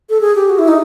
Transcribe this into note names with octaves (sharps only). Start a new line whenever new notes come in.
A4
G#4
G4
F#4
E4
D#4